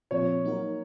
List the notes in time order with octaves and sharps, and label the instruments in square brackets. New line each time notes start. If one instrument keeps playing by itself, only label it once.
[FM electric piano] A#2 F3 C4 F4 [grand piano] C#5
[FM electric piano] F#3 A#3 D#4 F#4 A#4